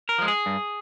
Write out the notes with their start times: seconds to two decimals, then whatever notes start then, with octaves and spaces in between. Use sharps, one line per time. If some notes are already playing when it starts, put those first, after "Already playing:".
0.09 A#4
0.18 F3 G#3
0.28 G#4
0.46 G2